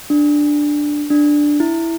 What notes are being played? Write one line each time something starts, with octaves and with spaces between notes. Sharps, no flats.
D4
D4
E4